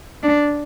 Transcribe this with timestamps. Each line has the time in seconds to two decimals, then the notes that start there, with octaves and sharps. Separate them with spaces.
0.23 D4